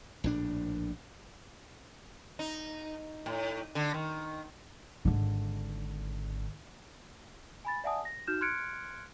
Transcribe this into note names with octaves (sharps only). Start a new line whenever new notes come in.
A#1 A2 D4
D#4
A2
D3
D#3
G#1 D3
G#5 B5 A6
D5 E5 F#5 G#5 A5 D#6
A#6
D#4 F#4 F6 G6 E7
C6 F6 F#6 G#6 C#7 D7